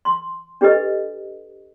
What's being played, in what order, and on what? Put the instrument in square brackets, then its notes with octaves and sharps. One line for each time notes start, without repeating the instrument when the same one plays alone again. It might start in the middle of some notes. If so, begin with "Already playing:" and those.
[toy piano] C6
D4 G4 A4 B4 D#5